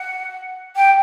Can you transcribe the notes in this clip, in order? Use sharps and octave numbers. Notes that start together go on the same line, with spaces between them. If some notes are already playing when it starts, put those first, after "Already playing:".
Already playing: F#5
G5